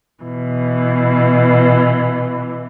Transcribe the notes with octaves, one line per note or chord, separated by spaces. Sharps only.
B2 E3